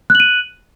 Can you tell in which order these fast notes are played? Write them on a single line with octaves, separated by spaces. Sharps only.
F#6 F#7 D#7